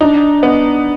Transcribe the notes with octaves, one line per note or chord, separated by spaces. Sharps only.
D4 D#4
B3